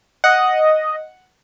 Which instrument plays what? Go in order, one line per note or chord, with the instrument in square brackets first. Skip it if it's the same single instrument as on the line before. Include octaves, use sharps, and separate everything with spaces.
[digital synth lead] D#5 [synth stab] F#5